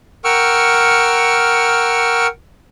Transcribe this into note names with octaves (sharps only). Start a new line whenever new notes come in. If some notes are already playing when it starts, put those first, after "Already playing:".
A#4 F#5 G5 C#6 E6 F6